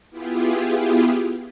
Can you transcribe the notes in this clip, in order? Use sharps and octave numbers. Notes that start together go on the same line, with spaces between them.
B3 E4 F4 G4 G#4